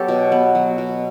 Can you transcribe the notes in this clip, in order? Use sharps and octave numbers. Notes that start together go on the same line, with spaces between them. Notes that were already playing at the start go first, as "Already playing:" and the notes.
Already playing: F#3 B3 G4 A4 C#5
B2
B3
F#3
B2